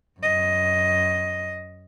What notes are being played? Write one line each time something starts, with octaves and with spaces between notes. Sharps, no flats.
F#2 D#5